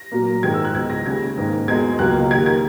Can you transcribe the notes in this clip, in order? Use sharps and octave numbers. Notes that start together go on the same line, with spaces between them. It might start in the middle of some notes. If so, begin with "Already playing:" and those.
Already playing: A#6
A#2 F#3 A#3
G#2 D#3 G#3 G#6
E6
F#6
C#2 B2 F#3 G#6
A#6
D#2 C#3 G#3 G#6
G#2 D#3 A#3
E2 B2 G#3 G#6
C#2 B2 F#3 A#3 F#6
D#2 D#3 A#3 G#6
G#6